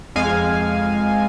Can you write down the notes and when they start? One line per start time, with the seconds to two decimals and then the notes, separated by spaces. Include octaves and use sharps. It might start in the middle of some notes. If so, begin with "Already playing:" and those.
0.16 F2 G#3 F5 G#5